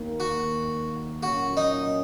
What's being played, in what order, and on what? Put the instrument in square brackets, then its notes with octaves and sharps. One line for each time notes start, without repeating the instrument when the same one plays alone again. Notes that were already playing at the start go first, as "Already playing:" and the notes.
Already playing: [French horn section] D#2 D#3 A#3
[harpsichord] F#4
[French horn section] A#2 F#3 A#3 C#4 [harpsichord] F#4
[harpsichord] D#4